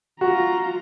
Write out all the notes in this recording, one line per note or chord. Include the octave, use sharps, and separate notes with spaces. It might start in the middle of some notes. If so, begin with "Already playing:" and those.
F4 F#4 A#5